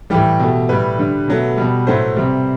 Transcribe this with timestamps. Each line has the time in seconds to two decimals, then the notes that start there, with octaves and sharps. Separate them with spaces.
0.10 A2 E3 G3 G4
0.40 B2 A3
0.69 A2 G3 B4
0.99 D3 G3
1.28 B2 F#3 A3
1.57 B2 G3
1.87 A2 F#3 A3 C5
2.16 C3 G3